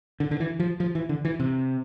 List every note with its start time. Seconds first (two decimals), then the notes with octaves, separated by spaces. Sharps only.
0.20 D3
0.31 D3
0.40 E3
0.60 F3
0.80 F3
0.95 E3
1.09 D3
1.25 E3
1.40 C3